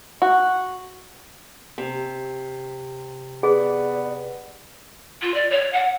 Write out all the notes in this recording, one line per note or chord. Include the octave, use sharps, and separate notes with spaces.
F#4
C3
B3 G#4 D5
F4
D5
C#5
F#5